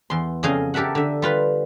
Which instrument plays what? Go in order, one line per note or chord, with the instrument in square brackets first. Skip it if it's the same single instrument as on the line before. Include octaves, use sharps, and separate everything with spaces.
[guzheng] E2 C6
F2 C#3 G#4 D#5 F5 G#5
G4 A4 A#4 E5 F#5
D3 E5
G3 F4 B4